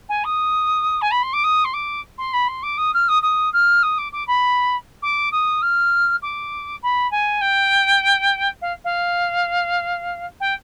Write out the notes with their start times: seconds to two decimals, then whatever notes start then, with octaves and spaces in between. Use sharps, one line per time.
0.09 G#5
0.24 D#6
1.01 G#5
1.11 B5
1.23 C6
1.33 D6
1.44 D#6
1.64 C6
1.73 D6
2.18 C6
2.33 B5
2.48 C6
2.63 D6
2.77 D#6
2.94 F6
3.08 D#6
3.22 D#6
3.53 F6
3.83 D#6
3.98 D6
4.12 D6
4.27 B5
5.02 D6
5.32 D#6
5.62 F6
6.22 D6
6.82 B5
7.11 G#5
7.41 G5
8.61 F5
8.84 F5
10.40 G5